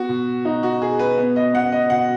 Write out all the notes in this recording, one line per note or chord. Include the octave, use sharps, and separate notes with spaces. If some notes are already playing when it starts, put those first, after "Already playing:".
Already playing: B3 F#4
B2
B2 D#4
F#4
B2 G#4
B4
B3
D#5
B3 F#5
D#5
B2 F#5